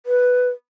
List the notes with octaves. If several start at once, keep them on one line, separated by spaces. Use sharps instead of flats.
B4